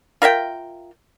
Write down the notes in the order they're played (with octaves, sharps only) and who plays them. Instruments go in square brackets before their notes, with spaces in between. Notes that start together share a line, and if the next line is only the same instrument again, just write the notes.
[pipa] F4 A#4 E5 G5